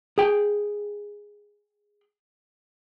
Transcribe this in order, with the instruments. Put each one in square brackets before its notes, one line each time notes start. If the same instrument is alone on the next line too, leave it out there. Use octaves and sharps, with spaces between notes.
[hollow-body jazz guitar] G#4 G5